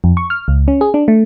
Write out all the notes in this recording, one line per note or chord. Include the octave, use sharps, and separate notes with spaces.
F2
C#6
F6
C#2
C#4
G#4
D4
A3